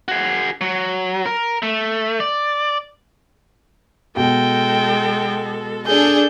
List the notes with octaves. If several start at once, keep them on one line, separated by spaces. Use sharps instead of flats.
F#4 G#4
F#3
A#4
A3
D5
B2 G#3 A4 G5
D4 G#4 A4 G6